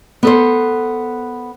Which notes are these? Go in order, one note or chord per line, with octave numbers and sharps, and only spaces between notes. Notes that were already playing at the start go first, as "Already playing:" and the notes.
B3 A4 C5